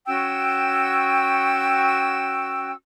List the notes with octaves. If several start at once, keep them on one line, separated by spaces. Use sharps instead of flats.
C#4 F#4 G5 E6